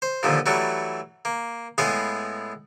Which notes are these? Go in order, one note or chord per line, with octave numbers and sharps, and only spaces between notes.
C5
D#2 A#2 D3 F3
E3 F#3 G3 A3 F#4
A#3
A2 G#3 B3 G#4 F5